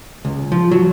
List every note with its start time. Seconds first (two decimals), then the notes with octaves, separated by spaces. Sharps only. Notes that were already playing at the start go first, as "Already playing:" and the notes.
0.25 C#2
0.52 F3
0.71 F#3